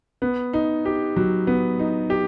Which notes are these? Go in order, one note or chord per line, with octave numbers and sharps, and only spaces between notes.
B3
D#4
G4
F#3
B3
D#4
G4